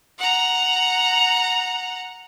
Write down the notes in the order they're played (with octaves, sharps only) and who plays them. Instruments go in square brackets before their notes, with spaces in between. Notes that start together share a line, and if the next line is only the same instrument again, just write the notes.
[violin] F#5 A#5